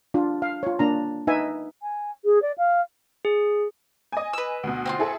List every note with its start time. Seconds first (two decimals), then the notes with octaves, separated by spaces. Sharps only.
0.14 D4 F4
0.42 F5
0.63 F4 C#5
0.79 A#3 D4 A#5
1.27 D#4 B4 E5 G#5
1.82 G#5
2.25 G#4
2.42 D5
2.58 F5
3.25 G#4
4.12 D#5 G#5
4.33 B4 E6
4.63 D2 B2
4.86 C4 D#4 F4
4.99 E4 G#4 A4